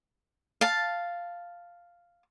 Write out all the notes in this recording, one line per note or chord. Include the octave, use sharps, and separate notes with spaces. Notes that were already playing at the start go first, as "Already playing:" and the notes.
F5 A5